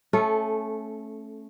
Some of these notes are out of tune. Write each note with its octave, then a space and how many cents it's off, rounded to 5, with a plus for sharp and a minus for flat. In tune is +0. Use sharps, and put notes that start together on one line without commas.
A3 +0 C#4 -15 A4 -20